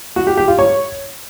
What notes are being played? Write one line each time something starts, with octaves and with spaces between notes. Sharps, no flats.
F#4
G4
G4
F4
C#5